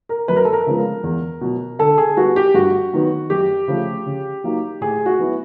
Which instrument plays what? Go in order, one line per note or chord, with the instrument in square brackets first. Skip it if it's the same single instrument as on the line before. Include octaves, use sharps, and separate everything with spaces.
[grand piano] A#4
F#2 B4
A#4
A4
A#4
C#3 F3 G#3 B3
E2
B2 F#3
D3 A4
G#4
G3 B3 F#4
G4
G2 F#4
D#3 F#3 B3
F#2 G4
C#3 F3 A3
C#3
F#3 A#3 D#4
A2 G#4
F#4
F#3 B3 E4